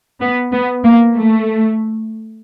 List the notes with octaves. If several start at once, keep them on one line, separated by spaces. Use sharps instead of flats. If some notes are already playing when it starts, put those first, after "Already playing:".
B3
B3
A#3
A3